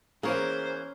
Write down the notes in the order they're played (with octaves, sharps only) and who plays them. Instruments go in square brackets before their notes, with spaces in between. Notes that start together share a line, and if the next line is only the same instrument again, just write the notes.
[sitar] E3 G#4 [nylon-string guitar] A#3 [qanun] C#4 A#4 C#5 [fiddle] C5